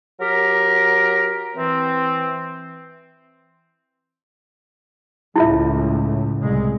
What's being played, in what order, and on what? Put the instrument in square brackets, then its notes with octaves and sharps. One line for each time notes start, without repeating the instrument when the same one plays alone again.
[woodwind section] F#3 G4 A#4
E3 C4
[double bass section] C#2 A2 [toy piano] E4 F4 E5
[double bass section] C2 G#3